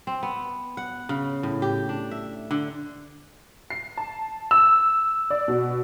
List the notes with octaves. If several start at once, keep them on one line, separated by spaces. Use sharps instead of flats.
C4
B3
F#5
C#3
A2
G4
D4
E5
D3
C7
A5
E6
D5
B2